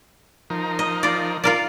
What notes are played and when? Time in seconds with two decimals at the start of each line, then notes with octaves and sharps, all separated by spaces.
0.50 F3 D#4 A#4
0.79 D#5
1.03 F4 D5
1.44 F4 A#4 D5